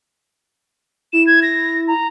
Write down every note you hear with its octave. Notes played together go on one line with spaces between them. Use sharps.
E4 E7
G#6
A#6
A#5